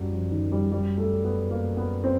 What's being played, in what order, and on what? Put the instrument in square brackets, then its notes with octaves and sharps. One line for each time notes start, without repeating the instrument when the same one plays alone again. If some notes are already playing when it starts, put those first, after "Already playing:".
Already playing: [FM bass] F#2 [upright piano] F#3 G3
[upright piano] F3
D#3
G3
G3
A3
B3
A#3
B3
C4